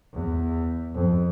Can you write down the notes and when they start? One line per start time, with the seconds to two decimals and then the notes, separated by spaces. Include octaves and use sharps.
0.14 E2
0.95 F2